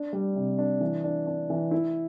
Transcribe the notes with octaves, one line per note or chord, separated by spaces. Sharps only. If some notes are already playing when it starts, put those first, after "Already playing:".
Already playing: D4
G3
C3
D4
E3
D4
D4
E3
E4